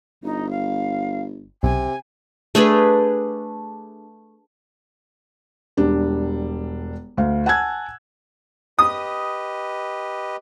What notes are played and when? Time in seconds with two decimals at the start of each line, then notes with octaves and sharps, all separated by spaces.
0.24 G1 D#4
0.50 F5
1.63 B1 C3 G#5
2.55 A3 D4 G#4 B4
5.77 E1 G3 D4
7.17 D2 F5
7.46 F#5 G#5 A5 E6 F#6 G#6
8.79 G4 B4 D#5 D#6